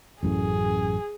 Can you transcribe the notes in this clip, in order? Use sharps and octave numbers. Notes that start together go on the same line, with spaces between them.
A1 F#2 A2 G#4